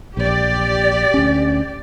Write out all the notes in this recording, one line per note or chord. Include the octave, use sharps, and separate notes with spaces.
A#1 G4 D5
D2 C#4